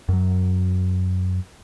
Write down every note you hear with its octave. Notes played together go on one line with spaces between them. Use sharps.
F#2 F#3